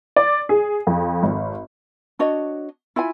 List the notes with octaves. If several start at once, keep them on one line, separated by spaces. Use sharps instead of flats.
D5
G#4
F2
G#1
D4 F#4 C#5 D#5
E4 F4 E5 G#5